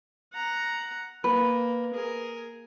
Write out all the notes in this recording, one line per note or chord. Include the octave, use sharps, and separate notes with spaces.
F#5 A#5
A#3 B4
G#4 A#4